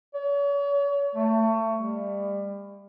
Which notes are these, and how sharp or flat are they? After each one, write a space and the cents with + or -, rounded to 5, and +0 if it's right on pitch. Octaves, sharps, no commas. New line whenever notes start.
C#5 +40
A3 +25
G3 +30